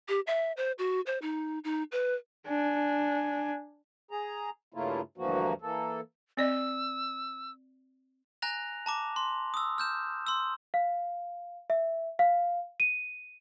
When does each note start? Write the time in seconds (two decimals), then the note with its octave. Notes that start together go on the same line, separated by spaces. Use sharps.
0.08 G4
0.27 E5
0.57 C5
0.78 F#4
1.06 C5
1.22 D#4
1.64 D#4
1.92 B4
2.47 D4 G#5
4.11 G#4 A#5
4.74 G2 C#3 A3 A#3 E4 F4
5.18 D2 G2 E3 F3 A#3 F#4
5.62 E3 A#3 A4
6.37 C4 D5 D#5 E6
8.42 G#5 A#5 F#6 A#6 F7
8.86 A5 A#5 D6
9.16 C6
9.54 D#6 E6
9.78 F6 G6 E7
10.27 C6 E6
10.74 F5
11.70 E5
12.19 F5
12.80 D#7